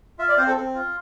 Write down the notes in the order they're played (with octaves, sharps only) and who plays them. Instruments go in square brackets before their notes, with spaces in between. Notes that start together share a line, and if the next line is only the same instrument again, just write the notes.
[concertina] F4 E5
D5
C4 C5
A4
C4
F4